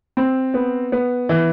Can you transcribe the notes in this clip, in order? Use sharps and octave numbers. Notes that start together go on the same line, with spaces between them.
C4
B3
B3
E3